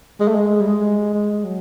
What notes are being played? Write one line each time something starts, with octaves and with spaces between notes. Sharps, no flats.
G#3
A3
G#3
G3
G#3
G#3
F#3